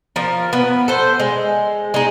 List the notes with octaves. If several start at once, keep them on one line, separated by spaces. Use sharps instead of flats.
F3 A#4
B3
A4 C5
G#3
G#3 D#4